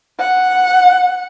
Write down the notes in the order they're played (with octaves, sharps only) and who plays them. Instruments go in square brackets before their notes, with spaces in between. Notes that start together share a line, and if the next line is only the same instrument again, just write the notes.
[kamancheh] F#5